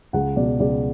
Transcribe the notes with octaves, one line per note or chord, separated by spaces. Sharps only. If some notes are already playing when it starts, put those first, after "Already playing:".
C#2 F#5
B2 D5
C#2 D5